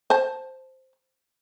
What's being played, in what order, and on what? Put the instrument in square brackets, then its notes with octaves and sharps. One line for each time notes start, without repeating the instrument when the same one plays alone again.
[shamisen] C5 A5